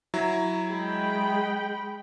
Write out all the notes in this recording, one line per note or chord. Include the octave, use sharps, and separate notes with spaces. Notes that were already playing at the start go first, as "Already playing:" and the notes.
F#3 E4 A#5
G#3 G5 B5